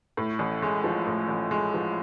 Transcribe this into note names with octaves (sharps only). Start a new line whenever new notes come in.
A2
A1
G#3
F3
A2
A1
G#3
F3